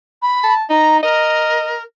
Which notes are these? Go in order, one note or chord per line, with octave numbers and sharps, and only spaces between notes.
B5
A5
D#4 A#5
A#4 D#5